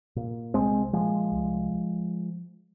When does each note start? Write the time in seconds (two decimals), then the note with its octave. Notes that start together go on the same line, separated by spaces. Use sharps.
0.16 A#2
0.54 C2 G#3 C4
0.93 A#2 F3 G#3
1.32 C2